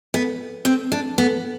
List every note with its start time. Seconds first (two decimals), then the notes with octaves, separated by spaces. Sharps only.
0.14 B3
0.65 C4
0.92 D4
1.18 B3